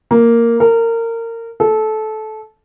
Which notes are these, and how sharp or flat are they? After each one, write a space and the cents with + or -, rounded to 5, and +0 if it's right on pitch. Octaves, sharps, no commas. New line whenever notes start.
A#3 -5
A#4 -25
A4 -20